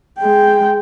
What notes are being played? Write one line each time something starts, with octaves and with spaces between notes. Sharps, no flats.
G#3 G5